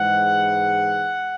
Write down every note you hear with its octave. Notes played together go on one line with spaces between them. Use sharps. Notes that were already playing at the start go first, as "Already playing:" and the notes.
Already playing: G#2 E3 G#3 F#5